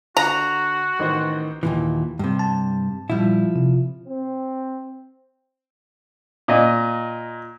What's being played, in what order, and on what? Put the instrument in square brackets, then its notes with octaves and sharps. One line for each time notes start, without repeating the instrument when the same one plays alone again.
[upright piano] D3 [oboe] F#4 [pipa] A#5
[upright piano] A1 D#3 C5
[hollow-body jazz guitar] D#2 A#2 E3
G2 C3
[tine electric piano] A5
[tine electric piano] A#2 G3 [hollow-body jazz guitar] F3 E4
[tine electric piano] C3
[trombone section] C4
[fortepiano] A#2 D#5